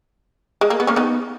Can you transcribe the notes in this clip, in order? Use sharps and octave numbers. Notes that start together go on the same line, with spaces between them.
G#3
A#3
B3
A#3 C#4
B3 D#4